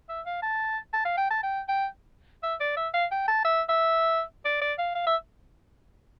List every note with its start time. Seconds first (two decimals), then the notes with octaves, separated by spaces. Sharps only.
0.09 E5
0.26 F5
0.42 A5
0.93 A5
1.05 F5
1.17 G5
1.30 A5
1.43 G5
1.68 G5
2.43 E5
2.60 D5
2.76 E5
2.94 F5
3.11 G5
3.28 A5
3.44 E5
3.69 E5
4.45 D5
4.62 D5
4.79 F5
4.95 F5
5.07 E5